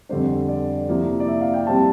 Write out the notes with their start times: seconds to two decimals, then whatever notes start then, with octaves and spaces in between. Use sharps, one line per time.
0.09 F2 D3 G3 D4 C5
0.48 D5
0.88 C3 F3 A#3 E4
1.20 D5
1.28 E5
1.41 F5
1.54 G5
1.67 C3 G3 C4 E4 A5